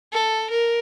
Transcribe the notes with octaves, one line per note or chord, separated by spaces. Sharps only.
A4
A#4